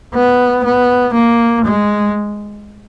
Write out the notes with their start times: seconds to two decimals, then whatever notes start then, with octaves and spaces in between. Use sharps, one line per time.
0.15 B3
0.64 B3
1.14 A#3
1.65 G#3